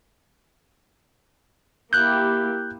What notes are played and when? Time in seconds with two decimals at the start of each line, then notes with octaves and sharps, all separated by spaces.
1.93 A#3 E4 G4 F#6 G6